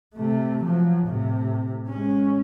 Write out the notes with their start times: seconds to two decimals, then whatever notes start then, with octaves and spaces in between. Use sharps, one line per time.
0.15 C3 A3
0.63 F3 F#3
1.07 A2 C3
1.88 G#3 C#4